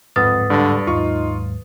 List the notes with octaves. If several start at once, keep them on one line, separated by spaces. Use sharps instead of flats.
D1 F2 G#2 B4 F#5 D#6 A6
G2 D3
D#2 G#2 F#3 D#4 F4 C#6